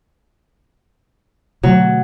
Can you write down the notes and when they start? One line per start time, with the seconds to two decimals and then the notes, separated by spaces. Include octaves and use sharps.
1.63 B2 D3 F#3 A3